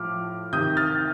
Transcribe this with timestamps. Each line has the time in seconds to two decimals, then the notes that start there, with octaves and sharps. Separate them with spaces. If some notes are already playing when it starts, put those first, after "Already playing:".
Already playing: A2 F3 D6 F6
0.53 C3 D#3 D#6 G6
0.77 F6 A6